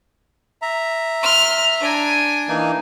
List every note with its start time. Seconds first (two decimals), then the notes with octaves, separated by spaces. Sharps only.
0.62 E5 A#5
1.22 C6 F6
1.81 D4 G#5
2.48 E3 A#3 D#4